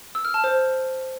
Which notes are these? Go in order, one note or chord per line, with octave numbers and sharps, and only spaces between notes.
E6
F6
A5
C5